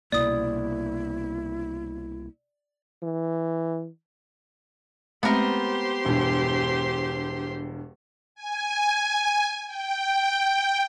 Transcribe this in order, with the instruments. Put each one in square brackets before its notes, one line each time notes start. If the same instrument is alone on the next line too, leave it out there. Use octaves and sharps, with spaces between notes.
[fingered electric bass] C2 B2 A#3 [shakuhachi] E4 [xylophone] D5 D#6
[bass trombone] E3
[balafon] G#3 A3 C4 [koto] B3 A#4 [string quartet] G4 C5 C6
[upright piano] E1 G2
[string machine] G#5
G5